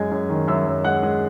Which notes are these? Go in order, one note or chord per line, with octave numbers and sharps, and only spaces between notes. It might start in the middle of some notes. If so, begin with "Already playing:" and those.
Already playing: F#2 G#3 G#5 G#6
F#2
D#3
F#2 E5 E6
F#2
G#3 F#5 F#6
G#3